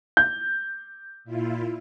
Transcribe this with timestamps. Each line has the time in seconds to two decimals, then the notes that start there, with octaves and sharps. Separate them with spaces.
0.17 G6
1.24 A#2 E4 F4